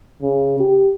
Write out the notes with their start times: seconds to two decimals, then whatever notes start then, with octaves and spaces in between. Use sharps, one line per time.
0.22 C#3
0.60 G4